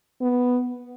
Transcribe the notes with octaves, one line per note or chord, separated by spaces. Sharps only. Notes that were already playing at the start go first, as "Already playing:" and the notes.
B3